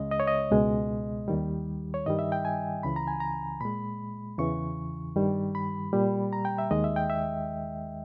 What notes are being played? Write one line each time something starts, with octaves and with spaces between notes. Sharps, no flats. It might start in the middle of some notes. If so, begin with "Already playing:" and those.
Already playing: C#2 C#3 G#3 D#5
D#5
C#5
D#5
C#2 B2 G#3
D#2 D#3 G3
C#5
G2 D#3 G3 D#5
E5
G5
G#5
C#2 C#3 E3 B5
A#5
G#5
A#5
A#2 G#3 B5
E2 C#3 E3 C#6
G2 D#3 G3
B5
A#2 G3
A#5
G5
E5
D#2 D#3 G#3 D#5
E5
G5
E5